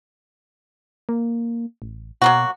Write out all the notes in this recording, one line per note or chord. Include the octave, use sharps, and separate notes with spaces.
A#3
A1
B2 F#3 A#3 F#4